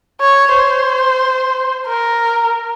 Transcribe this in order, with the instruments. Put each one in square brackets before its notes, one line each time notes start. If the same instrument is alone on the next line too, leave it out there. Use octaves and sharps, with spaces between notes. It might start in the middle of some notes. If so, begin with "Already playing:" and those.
[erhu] C#5
C5
A#4